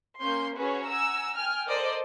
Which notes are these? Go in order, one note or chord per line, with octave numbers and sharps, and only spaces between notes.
A#3 C#4 C6 G6
C#4 F#4 G#4 B4 C#5
F#5 G#5 A#5 E6
G5 G#5 F6
A4 A#4 C5 D5 D#5